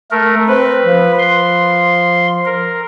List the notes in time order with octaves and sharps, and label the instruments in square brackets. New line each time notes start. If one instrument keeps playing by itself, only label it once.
[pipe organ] A3 A#4
[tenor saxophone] C4 [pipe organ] B4
[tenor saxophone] F3
[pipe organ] C6
A#4